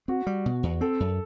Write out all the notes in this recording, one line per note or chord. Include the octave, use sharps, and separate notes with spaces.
C4 F#4
G3
B2
E2
C4 A4
F#2